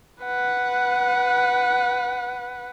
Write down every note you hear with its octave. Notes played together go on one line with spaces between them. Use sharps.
B4 F#5